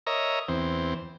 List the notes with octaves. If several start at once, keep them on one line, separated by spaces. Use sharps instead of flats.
A#4 C#5 D#5 E5 A#5
E2 C4